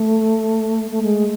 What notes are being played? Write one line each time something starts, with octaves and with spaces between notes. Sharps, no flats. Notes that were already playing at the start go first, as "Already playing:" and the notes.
Already playing: A3
A3
G#3